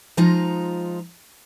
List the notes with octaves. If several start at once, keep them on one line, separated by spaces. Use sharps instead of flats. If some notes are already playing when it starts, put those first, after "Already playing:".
F3 G#3 D#4 F4 A#5